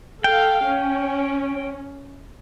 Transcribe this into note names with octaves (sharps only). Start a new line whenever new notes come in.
A4 F5 G5
C#4